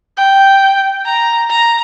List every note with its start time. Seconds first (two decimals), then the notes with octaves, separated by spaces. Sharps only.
0.17 G5
1.05 A#5
1.50 A#5